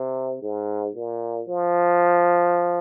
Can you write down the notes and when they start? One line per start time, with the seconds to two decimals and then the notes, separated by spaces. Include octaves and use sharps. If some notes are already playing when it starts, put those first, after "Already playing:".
Already playing: C3
0.42 G#2
0.95 A#2
1.48 F3